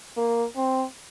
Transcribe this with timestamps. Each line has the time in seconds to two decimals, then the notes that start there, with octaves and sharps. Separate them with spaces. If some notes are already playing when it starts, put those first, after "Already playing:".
0.17 A#3
0.56 C4